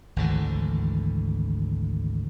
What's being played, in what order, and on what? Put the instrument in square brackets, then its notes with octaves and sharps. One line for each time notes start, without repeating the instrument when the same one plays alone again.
[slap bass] G#1 D2 D3 E3